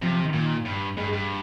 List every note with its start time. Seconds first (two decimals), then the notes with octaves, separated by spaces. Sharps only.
0.02 C3 F3
0.12 F3
0.23 D#3
0.33 A#2 D#3
0.65 G2
0.97 G2 G#3
1.07 G#3
1.13 G2